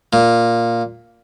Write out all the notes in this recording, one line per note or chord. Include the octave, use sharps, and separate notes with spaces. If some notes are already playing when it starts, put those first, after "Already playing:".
A#2